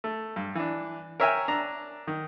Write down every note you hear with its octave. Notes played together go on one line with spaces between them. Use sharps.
A3
G2
E3 D4
A#4 C#5 E5 G5 G#5
D4 A#5
D#3